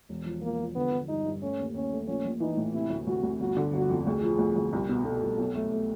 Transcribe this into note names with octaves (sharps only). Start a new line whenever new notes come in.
E1
F3
F3 A#3
F3
D3 B3
D3
G2 D#4
G2
A3 C#4
D#2
D#2 C#4
A3
A#1 C#4
A#1
E3 D#4
A2
C3 E4
D2
D2 F#4
D2
G1 F#4
D3
G1 F#4
F2
D2 G#4
F3
D2
D2
C2
B2
B2 A4
C2
B1
A3
A3